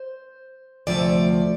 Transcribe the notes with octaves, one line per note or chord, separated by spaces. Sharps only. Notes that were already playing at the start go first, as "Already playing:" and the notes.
Already playing: C5
D2 C3 F3 A3 D5